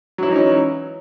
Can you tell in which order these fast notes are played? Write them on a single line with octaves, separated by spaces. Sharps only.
F#3 E4 E3 D#4 C#4